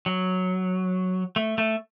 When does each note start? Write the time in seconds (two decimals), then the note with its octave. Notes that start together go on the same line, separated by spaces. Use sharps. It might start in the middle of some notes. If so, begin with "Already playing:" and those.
0.06 F#3
1.36 A3
1.58 A3